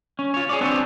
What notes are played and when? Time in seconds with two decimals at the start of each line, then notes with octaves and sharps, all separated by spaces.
0.19 C#4
0.34 F4 C#5
0.49 G#4 C#5 D5
0.61 B3 C4 D4 C#5